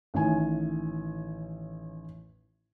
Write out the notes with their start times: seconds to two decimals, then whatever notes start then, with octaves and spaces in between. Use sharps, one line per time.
0.14 A1 A2 D#3 G#5